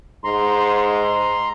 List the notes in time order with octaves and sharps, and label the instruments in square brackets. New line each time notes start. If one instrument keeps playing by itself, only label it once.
[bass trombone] G#2 [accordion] A#5 C6